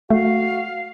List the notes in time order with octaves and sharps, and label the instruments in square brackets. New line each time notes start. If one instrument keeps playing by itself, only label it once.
[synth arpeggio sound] A3 [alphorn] F#4 [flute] F5